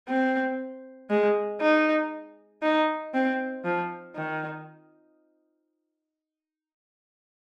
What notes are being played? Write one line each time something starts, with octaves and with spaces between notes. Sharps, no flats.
C4
G#3
D#4
D#4
C4
F3
D#3